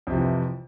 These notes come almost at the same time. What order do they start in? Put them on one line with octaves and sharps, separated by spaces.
F2 C3 F3 E3